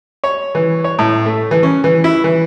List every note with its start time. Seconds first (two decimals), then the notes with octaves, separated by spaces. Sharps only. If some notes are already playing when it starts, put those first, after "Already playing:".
0.24 C#5
0.55 E3
0.84 C#5
0.99 A2
1.26 A3
1.51 E3
1.63 C#4
1.84 E3
2.04 E4
2.24 E3